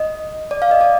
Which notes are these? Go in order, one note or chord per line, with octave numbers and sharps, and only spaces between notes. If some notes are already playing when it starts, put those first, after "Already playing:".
Already playing: D#5
D5
F5
D#5
D5